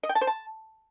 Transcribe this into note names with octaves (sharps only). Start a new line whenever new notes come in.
D#5
G5
A5
C5
A5